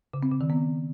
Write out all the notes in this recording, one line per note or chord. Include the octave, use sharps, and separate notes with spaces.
C#3
C4
C#3
D#3
B3